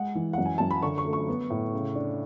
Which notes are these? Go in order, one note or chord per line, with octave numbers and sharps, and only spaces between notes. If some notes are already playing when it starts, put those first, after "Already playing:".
Already playing: G#3 F#5
E3
F#2 F#5
G#5
F#2 A5
B5
D3 C#6
C#6
A3
C#6
B3
A2
C#3
D4